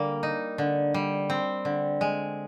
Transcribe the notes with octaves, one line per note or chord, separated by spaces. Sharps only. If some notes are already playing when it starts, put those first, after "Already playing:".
Already playing: D3 G3 A#3
D#4
D3
G3
C4
D3
G#3